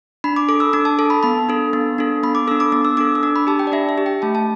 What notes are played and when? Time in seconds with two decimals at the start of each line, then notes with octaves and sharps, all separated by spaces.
0.24 D4 B5
0.36 D6
0.49 A4 D6
0.60 E6
0.73 D4 D6
0.85 A5
0.99 A4 A5
1.10 B5
1.23 B3 B5
1.49 D4 A4
1.73 B3
1.98 D4 A4
2.23 B3 B5
2.35 D6
2.47 D4 A4 E6
2.60 D6
2.72 B3 D6
2.85 E6
2.97 D4 A4 D6
3.15 E6
3.23 D4 D6
3.36 B5
3.47 G4 A5
3.59 G5
3.67 D5
3.72 D4 E5
3.89 E5
3.98 G4
4.06 G5
4.22 A3 A5
4.35 A5